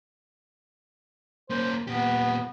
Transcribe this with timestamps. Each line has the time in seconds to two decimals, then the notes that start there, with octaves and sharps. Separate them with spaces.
1.50 A#3 C#4 C5
1.87 A#2 B3 G4